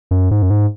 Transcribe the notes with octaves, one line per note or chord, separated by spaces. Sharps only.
F#2
G#2
F#2
G#2